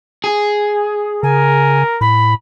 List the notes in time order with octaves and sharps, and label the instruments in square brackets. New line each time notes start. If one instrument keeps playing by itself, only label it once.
[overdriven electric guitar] G#4
[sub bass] C#3 [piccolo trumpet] A#4 [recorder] G#5
[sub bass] A2 [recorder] B5